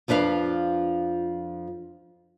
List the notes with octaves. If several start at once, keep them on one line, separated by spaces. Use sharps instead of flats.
F2 F3 D4 B4 F5